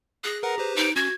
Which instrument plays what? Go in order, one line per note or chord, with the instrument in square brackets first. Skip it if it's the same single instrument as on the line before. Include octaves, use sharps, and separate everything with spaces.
[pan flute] G#4 [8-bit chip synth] F#6 A#6
[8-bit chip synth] A#4 B4 F#5 [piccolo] A#5
[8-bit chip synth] G4 B4 C5
[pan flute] D#4 [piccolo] D7
[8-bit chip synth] C#4 [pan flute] F#4 [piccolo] G#6